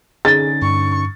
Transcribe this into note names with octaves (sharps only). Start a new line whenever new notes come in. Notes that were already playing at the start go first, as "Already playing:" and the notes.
D3 C#4 D#4 G#4 A6
G2 C#6